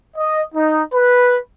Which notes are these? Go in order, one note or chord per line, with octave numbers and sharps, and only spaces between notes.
D#5
D#4
B4